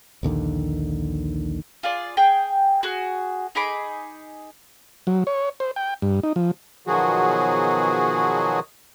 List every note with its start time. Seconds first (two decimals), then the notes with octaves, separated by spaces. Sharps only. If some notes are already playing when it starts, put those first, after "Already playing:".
0.23 A#1 D#2 D3 D#3
1.83 F4 G#4 D5
2.17 G#4 G5
2.83 F#4 G#4
3.55 D#4 G#4 B5 D6
5.07 F#3
5.27 C#5
5.60 C5
5.76 G5
6.02 G2
6.23 D#4
6.36 F3
6.87 B2 D#3 F3 F#3 F#4 G#4